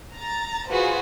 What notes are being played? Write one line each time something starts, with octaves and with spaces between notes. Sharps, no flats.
A#5 A6
F4 F#4 G#4 B4 C5